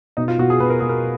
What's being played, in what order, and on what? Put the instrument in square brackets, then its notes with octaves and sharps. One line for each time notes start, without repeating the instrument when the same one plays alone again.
[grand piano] B2 [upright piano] D#4
[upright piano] F4
[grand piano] B2 [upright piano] F#4
[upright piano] G#4
[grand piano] B2 [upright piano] B4
[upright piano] A#4
[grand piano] B2 [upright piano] G#4
[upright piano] A#4